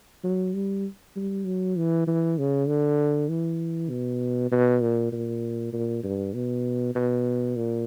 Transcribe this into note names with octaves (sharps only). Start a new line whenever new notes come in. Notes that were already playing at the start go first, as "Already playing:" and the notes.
F#3
G3
G3
F#3
E3
E3
C#3
D3
E3
B2
B2
A#2
A#2
A#2
G2
B2
B2
A#2